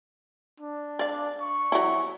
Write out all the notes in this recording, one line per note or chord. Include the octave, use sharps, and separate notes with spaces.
D4
D5 F5
C#6
F#3 E4